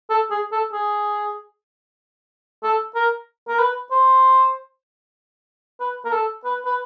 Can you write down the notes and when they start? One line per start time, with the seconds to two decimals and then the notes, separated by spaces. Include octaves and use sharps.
0.10 A4
0.31 G#4
0.52 A4
0.73 G#4
2.63 A4
2.95 A#4
3.48 A#4
3.59 B4
3.91 C5
5.80 B4
6.05 A#4
6.12 A4
6.45 B4
6.65 B4